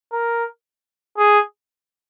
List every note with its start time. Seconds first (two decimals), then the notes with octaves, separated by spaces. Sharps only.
0.12 A#4
1.18 G#4